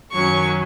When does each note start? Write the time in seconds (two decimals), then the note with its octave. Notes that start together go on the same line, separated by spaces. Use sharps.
0.12 F#2 D#3 F#3 C#4 C#6